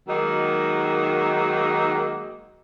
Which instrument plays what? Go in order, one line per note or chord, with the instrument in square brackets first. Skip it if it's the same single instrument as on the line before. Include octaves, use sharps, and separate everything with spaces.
[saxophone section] D#3 F#3 G#3 A#3 D#4 A#4